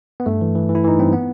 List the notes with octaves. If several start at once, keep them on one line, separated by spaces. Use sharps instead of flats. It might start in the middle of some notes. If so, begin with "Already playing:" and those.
B3
G2 A3
E3
E3
E3
E4
E3 D#4
G2 C4
B3